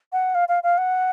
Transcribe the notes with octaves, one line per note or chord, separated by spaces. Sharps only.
F#5
F5
F5
F5
F#5